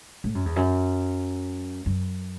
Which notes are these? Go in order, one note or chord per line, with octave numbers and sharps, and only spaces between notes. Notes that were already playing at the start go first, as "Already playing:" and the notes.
A2
F#2
E2
F#2
F#2